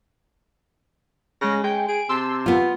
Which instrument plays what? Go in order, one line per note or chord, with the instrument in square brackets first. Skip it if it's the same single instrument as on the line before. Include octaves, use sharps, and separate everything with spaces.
[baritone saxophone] C#3 [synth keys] G#3 A#6
[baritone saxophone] G#3 [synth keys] G5
[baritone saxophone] G#4 [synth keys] D7
[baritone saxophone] C3 [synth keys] A5 C6 E6
[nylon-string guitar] B3 F4